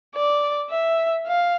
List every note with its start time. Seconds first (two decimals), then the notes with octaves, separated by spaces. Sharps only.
0.15 D5
0.70 E5
1.27 F5